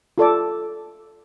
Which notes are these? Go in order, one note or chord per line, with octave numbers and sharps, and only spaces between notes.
F4 A4 D5 D6